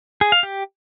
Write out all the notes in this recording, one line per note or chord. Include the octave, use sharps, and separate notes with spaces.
G#4
F5
G4